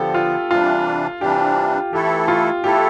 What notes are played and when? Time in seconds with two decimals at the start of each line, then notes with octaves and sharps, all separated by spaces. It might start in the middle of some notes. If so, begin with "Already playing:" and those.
Already playing: D3 F3 B3 G4 A4
0.15 F4
0.50 C3 E3 G3 D4 F4
1.21 C3 E3 G3 D4 G4
1.93 E3 A3 E4 G4 A4
2.28 F4
2.64 E3 A3 E4 G4 A4